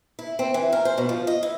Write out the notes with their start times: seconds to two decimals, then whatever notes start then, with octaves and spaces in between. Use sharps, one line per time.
0.19 E4
0.39 C4
0.54 E3
0.73 A#4
0.85 C5
0.98 B2
1.09 F3
1.27 D#5
1.43 E4